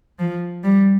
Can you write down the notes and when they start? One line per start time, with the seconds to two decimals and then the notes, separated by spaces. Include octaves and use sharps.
0.19 F3
0.64 G3